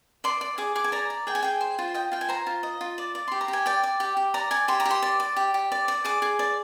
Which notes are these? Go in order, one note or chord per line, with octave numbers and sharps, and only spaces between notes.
D5 C6
D5
G#4 D6
G#4 D6
G#5
D5 A#5
D5
G#4 G5
G#5
G#4 G5
C5
F4
D#5 G5
F4 G5
G#5
C5 A#5
F4
D#5
F4
D5
D5
G4 C6
A#5
G4
G#5
D5 G5
D5
G4
G4
D5 A#5
D5 G#5
G4 C6
A#5
G4
C6
D5
D5
G4
G4
D5
D5
G#4 D6
G#4
D5